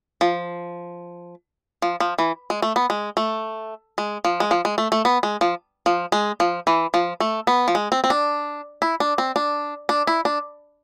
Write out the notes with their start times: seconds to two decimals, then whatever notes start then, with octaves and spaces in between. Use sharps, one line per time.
0.21 F3
1.82 F3
2.00 F3
2.18 E3
2.50 G#3
2.62 A3
2.76 B3
2.90 G#3
3.17 A3
3.98 G#3
4.25 F3
4.40 G#3
4.51 F3
4.65 G#3
4.78 A3
4.92 A3
5.05 B3
5.23 G#3
5.41 F3
5.86 F3
6.12 G#3
6.40 F3
6.67 E3
6.94 F3
7.20 A3
7.47 B3
7.68 F3
7.75 G#3
7.92 C4
8.04 C4
8.10 D4
8.82 E4
9.00 D4
9.18 C4
9.36 D4
9.89 D4
10.07 E4
10.25 D4